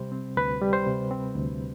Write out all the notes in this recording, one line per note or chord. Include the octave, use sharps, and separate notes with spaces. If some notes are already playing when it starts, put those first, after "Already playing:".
Already playing: C3 G3 C5
C4
D2 B4
G3
C5
C3
C4
D2